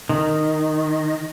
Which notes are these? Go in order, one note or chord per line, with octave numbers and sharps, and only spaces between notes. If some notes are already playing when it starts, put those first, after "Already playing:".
D#3